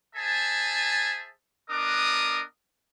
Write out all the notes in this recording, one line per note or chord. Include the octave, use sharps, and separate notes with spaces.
G#4 C5 E5 G#5 A5
B3 D4 A#4 D#5 D6 D#6